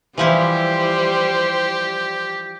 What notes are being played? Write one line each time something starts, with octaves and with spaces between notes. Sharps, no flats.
E3 F3 G3 E4 G4 C5